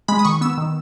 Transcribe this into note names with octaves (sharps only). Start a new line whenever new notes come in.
G#3 B5
D#6
D#3 C#6
B3 E6
D#3